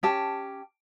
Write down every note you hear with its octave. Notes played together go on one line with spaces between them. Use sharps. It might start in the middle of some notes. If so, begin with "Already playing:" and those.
C#4 G4 A5